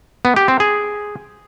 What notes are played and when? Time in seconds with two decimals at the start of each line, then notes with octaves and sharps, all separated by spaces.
0.25 B3
0.36 G4
0.48 C4
0.60 G#4